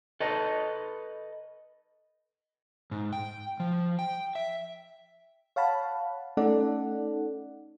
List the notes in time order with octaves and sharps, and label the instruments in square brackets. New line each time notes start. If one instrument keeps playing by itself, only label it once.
[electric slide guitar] A4 B4 D#5
G#2
G5
F3
G5
E5
[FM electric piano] C#5 F5 F#5 A5 B5
A3 C#4 D#4 A4 D5 F#5